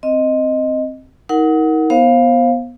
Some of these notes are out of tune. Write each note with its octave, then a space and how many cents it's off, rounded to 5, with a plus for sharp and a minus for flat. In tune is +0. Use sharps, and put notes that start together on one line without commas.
C4 +0 D#5 +0
D#4 +35 A#4 +0 F#5 +0
B3 -10 C5 +25 F5 +0